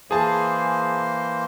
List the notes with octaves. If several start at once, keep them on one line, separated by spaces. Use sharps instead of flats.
E3 A#3 G#4 C5 A5